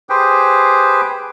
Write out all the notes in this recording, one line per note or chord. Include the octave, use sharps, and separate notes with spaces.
G4 G#4 B4 C5 G5